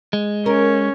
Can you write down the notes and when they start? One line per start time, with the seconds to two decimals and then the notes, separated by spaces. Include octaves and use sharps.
0.13 G#3
0.46 C#4 A#4